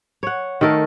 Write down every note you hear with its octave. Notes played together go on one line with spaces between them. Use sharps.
C#5 F#5
D#3 A3 A4 A#4